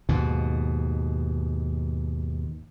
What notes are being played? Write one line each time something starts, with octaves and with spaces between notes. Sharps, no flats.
D#2 G#2 B2